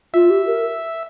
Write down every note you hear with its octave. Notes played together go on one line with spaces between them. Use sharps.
F4 E5
G4
A#4